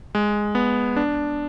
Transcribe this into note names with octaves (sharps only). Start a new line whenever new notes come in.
G#3
B3
D4